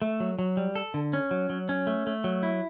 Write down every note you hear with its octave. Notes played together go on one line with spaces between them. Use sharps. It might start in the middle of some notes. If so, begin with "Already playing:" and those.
A3
F#3
F#3
G3
A4
D3
C#4
F#3
F#3
C#4
A3
A3
F#3
E4